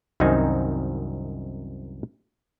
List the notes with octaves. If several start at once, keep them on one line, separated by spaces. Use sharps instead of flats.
C2 F#2 D#3 C4 D#4 G#5